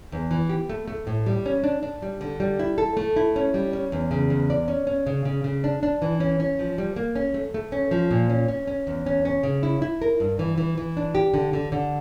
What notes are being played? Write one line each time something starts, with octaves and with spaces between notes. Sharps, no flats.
E2
E3
G4
A3
A3
A2
G3
C#4
D4
D4
G3
D3
G3
E4
A4
A3
E4
C#4
G3
C#4
E2
C#3
E2
D5
C#4
C#4
C#3
C#3
C#3
D4
D4
E3
C#4
C#4
F3
G3
A#3
C#4
A3
A3
C#4
F3
A#2
C#4
C#4
C#4
E2
C#4
C#4
C#3
E4
E4
A#4
G2
E3
E3
E3
D4
G4
D3
D3
D3